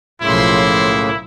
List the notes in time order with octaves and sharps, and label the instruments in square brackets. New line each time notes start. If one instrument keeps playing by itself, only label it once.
[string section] B1 F3 C6 [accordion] A2 C#3 A#3 [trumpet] E4